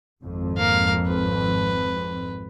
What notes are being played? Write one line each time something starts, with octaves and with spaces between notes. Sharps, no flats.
G#1 F2
A#3 F5
B4